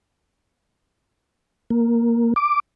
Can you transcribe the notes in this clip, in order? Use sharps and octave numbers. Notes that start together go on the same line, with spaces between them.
A#3
D6